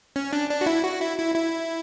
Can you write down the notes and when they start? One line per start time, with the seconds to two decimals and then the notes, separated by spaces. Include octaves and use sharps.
0.16 C#4
0.33 D4
0.50 D4
0.61 F#4
0.66 E4
0.84 F#4
1.01 E4
1.18 E4
1.35 E4